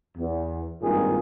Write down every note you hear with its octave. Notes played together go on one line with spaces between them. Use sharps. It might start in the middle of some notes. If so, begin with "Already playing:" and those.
E2
G#1 G2 A#2 D#3 F4 G#4